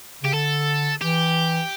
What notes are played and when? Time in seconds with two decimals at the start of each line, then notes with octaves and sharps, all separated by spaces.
0.23 C#3 G4
0.33 D3 A4
1.01 E3 G4